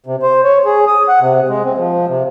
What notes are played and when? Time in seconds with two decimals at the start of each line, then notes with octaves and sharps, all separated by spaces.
0.06 C3
0.22 C5
0.44 C#5
0.65 G#4
0.87 D#6
1.09 F#5
1.20 C3
1.49 G#3
1.64 C4
1.78 F3
2.07 C3